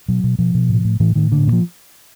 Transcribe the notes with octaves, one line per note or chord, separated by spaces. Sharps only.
B2 F#3
B2
B2 F3
B2
A2
A2
A2 E3
A2 D#3
A#2 D3
A#2
F3